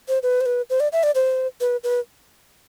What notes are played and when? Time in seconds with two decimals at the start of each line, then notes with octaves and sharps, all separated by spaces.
0.08 C5
0.23 B4
0.41 C5
0.46 B4
0.70 C5
0.80 D5
0.93 E5
1.03 D5
1.15 C5
1.61 B4
1.84 B4